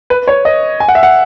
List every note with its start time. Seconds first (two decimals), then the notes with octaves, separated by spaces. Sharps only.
0.10 B4
0.28 C#5
0.45 D#5
0.80 G#5
0.88 F#5
0.95 E5
1.03 F#5